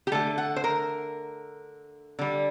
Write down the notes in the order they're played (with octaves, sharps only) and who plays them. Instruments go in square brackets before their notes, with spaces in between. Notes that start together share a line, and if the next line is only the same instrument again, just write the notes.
[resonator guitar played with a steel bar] G4
D3 A3 A4
F#5
C5
A#4
D3 G3